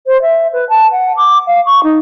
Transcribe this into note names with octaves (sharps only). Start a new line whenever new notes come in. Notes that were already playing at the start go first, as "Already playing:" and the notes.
C5
E5
B4
A5
F#5
D6
F5
C#6
D#4